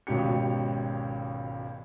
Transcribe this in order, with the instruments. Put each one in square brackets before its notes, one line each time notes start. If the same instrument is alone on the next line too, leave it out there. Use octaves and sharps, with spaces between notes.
[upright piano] G#1 C#2 B2 C#4 G4 C#7